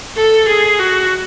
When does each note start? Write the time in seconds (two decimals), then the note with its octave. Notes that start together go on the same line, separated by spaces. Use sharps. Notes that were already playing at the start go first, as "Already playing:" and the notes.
0.16 A4
0.48 G#4
0.79 F#4